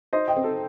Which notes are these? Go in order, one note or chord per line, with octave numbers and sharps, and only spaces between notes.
D#4 C5 D#5
D#5 G5
C4
A4